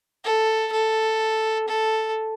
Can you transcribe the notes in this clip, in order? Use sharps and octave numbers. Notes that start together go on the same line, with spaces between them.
A4
A4
A4